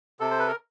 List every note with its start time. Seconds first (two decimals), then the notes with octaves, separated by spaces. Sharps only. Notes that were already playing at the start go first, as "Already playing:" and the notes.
0.20 C3 A4
0.31 C5
0.39 B4
0.47 A#4